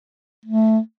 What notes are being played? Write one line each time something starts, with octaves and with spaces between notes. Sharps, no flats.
A3